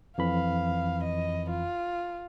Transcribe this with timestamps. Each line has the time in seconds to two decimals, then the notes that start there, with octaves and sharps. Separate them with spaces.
0.18 F2 E3 F5 B5
1.04 D#5
1.50 F4